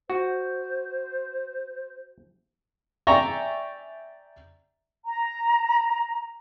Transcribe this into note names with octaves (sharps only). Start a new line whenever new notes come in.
F#4 C5
D5 E5 G5 G#5 A#5 C#6
A#5